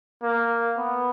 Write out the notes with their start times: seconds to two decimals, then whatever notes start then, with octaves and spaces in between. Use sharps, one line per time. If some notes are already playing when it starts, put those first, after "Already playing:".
0.23 A#3
0.78 B3